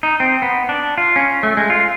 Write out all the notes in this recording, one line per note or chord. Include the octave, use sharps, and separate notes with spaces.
D#4
C4
B3
D4
F4
C#4
A3
G#3
F4